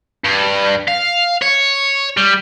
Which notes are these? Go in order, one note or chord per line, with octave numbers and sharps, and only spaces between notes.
G2
F5
C#5
G3